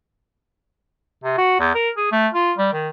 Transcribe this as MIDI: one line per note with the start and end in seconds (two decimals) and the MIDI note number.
1.24 1.36 48
1.38 1.58 66
1.60 1.70 40
1.75 1.90 70
1.97 2.08 68
2.12 2.28 57
2.34 2.52 65
2.58 2.71 55
2.73 2.89 51